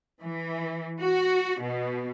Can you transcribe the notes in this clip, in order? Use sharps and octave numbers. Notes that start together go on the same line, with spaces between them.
E3
F#4
B2